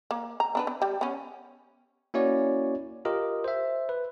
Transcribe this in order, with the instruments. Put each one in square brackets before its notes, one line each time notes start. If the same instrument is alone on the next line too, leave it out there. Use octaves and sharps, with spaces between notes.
[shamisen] A#3
A#5
B3 D4 B4
B3
G3
B3 C#4
[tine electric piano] A#3 C#4 E4 F#4 C#5 D5
F4 G4 A#4 D#5
C5 E5
B4